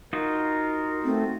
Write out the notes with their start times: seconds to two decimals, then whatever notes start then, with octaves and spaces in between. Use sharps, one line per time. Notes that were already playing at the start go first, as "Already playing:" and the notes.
0.13 D#4 F4 F#4 A#4
1.04 A3 C4